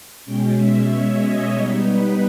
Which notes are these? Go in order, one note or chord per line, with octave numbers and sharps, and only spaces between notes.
B2 G#3 C#4 G5
E5
C#5
D#5
G3 B3 D#4 C#5
B4